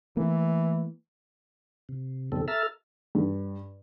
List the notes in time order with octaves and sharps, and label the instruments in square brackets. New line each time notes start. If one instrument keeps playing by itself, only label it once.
[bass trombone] E3 [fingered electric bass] A3 A#3
[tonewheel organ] C3
F2 B2 D#3 G3 C4 A4
A4 E5 A#5 E6 F6 A6
[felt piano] G2